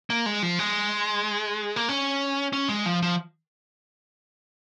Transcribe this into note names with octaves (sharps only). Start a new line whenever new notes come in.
A#3
G#3
F3
G#3
A#3
C#4
C#4
G#3
F3
F3